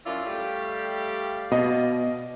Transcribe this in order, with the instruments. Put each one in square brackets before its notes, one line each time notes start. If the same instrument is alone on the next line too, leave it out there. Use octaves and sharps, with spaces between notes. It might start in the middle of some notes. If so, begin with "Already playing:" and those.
[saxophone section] F#2 E4 F4 [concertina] D5 F5
[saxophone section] G3 A3 G4
[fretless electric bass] B2 [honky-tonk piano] D#5